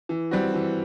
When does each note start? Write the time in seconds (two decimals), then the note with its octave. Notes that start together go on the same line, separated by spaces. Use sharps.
0.09 E3
0.31 G3 C4 F#4
0.54 E3